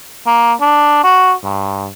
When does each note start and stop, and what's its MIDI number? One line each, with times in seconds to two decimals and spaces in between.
0.26 0.53 58
0.61 1.03 62
1.04 1.33 66
1.44 1.89 43